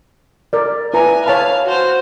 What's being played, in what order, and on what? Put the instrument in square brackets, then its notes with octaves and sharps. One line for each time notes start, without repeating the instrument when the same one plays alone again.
[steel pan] A#4 D5
[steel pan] E4 B4 A#5 [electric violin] G#5
[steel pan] C#5 A5 B5 [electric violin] F5
[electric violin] F#4 C5